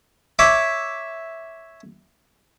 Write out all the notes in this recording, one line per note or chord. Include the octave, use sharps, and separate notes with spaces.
C#5 E5 D6